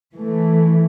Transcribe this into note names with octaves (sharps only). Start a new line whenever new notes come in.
E3 A3